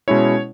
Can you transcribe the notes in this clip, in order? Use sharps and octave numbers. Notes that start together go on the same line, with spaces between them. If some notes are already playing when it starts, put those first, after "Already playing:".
B2 G#3 C#4 E4 C#5